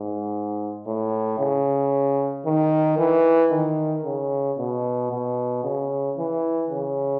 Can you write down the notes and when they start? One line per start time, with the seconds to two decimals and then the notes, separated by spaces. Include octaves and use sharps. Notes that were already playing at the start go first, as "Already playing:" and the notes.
Already playing: G#2
0.87 A2
1.39 C#3
2.46 D#3
2.98 E3
3.52 D#3
4.05 C#3
4.58 B2
5.11 B2
5.64 C#3
6.18 E3
6.71 C#3